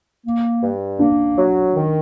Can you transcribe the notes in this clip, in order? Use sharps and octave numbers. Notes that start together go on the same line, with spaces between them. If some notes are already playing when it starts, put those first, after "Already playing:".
A#3
G2
A#3 D4
F#3
D#3